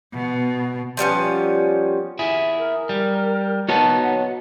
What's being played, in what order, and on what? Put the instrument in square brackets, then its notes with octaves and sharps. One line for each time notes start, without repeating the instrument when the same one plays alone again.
[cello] B2
[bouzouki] F3 G3 B3 C#4
[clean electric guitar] E4 G#4
[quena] A#4
[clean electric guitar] G3
[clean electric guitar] B3 D#4 [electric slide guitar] F#4 C#5 A5
[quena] F#5